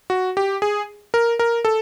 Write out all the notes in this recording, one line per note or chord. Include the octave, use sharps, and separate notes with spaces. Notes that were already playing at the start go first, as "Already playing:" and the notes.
F#4
G4
G#4
A#4
A#4
A4